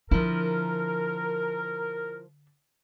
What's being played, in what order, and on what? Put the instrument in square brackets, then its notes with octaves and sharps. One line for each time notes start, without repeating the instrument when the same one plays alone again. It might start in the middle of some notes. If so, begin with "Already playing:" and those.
[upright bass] D3 D4 [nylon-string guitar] F3 E4 [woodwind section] A#4